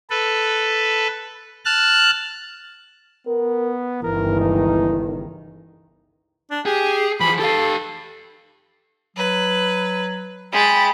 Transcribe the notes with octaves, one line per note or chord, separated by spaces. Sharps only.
A4 B4
A5 F6 F#6
B3 A#4
G1 C#2 D#3 E3 A#4
D#4
D4
G4 G#4
E3 F3 B5
G4 A4 F5
F#3 B4
G#3 G5 B5 A6